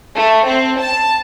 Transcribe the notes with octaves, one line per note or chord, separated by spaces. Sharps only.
A3
C4
A5